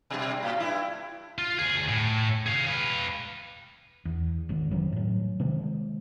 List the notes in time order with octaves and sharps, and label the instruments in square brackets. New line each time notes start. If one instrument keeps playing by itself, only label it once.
[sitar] B2 G3
A2
G2 E4
[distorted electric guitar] F4
D2 G#4
A2
G#4 F5
B4 F5
[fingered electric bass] E2
G#1 G#2 D#3
F#2 D#3 E3 F#3
A2 F#3
C3 D#3 F3 G#3